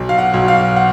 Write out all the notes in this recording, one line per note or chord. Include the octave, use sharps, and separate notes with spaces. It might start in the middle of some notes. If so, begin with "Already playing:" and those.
Already playing: B1
F5
F#5
B1
F5
F#5